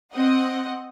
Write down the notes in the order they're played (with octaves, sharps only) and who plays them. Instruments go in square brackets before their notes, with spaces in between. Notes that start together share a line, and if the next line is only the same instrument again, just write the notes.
[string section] C4 D#5 F#5